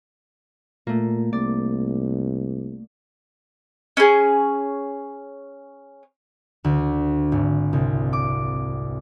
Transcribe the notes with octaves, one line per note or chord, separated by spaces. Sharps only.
A#2 A3 A#3
C2 D5
C#4 G#4
D2
G#1
C2
D6